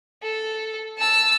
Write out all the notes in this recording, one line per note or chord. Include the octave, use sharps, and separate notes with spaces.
A4
A5 E6